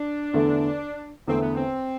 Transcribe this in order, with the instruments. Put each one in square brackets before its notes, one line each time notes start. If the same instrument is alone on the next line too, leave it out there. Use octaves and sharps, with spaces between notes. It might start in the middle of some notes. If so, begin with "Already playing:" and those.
Already playing: [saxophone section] D4
[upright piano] E2 D3 A3
[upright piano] E2 D3 A3 [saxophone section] C4
[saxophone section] B3
C4